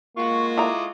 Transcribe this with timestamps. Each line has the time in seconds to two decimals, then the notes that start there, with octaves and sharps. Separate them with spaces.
0.17 G#3 A#3 F4 F#4 C#6
0.57 E4 A4 A#5 D6 D#6